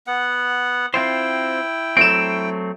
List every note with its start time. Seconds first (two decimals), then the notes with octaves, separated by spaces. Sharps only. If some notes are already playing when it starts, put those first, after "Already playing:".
0.07 B3 F#5
0.94 C4 E4 F4 C5 G5
1.97 F#3 A3 C4 D7 E7